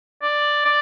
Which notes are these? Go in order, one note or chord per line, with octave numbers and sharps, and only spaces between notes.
D5
D5